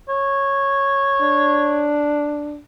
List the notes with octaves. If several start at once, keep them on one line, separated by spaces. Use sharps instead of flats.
C#5
D4